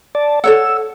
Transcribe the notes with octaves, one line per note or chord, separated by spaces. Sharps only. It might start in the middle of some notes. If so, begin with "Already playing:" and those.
D5 A5
A4 C#5 F#5 E6